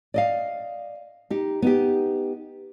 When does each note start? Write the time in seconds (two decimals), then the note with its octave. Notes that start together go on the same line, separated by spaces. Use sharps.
0.14 D5 D#5 F5
1.30 D#4 G4
1.62 B3 D#4 G4